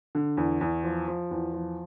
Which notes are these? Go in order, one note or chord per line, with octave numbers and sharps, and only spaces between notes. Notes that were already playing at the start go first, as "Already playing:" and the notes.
D3
E2
E2
F3
F3
E2
F3